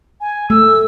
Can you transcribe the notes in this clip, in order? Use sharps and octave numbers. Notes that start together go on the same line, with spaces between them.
G#5
A3 E6